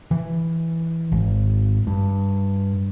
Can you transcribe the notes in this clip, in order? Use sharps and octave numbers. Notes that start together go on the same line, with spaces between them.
E3
G#1
G2